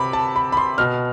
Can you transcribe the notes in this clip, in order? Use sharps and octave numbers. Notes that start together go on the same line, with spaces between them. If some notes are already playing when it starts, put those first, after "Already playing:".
Already playing: C3 B5 D6
A5
B5
B5
C6
B2 F6